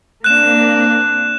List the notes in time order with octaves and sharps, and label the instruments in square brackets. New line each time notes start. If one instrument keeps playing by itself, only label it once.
[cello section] A#3 C4 D4 [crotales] F#6 E7